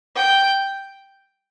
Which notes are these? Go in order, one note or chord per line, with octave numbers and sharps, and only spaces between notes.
G5